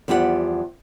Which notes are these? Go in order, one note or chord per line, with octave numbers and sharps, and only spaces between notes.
E2 F3 G3 G4 B4 F#5